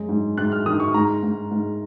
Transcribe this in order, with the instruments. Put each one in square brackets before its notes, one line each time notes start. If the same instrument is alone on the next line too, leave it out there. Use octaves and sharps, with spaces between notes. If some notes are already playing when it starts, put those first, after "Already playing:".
Already playing: [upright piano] F#2 G#3
G#2
G#2 F#6
F6
D#3 D#6
C#6
G#2 A#5
G#2
G#2